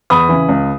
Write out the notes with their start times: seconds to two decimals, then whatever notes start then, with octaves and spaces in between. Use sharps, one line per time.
0.10 E2 B5 D#6
0.29 C#3 E3
0.49 C#2